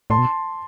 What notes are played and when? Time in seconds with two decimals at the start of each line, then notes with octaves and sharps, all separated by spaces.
0.10 A2 A5 C6
0.18 B2